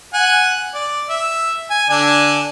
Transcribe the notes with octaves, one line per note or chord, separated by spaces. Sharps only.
F#5 G#5
D5
E5
G#5
D3 D4 G#5